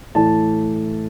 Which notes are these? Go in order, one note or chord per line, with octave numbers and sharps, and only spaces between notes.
A2 E3 A3 A5